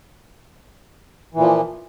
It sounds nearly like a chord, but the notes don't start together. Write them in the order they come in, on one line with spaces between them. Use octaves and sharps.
E3 A#2 F3 A#3